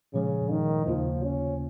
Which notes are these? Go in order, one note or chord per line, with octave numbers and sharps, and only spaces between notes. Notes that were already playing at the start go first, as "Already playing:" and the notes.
A#2 C#3 F3 G#3
D#3
D#2 C#3 F3 A#3 F4
C#4